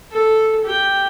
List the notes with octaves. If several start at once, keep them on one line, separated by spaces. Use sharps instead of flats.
A4
G4 G5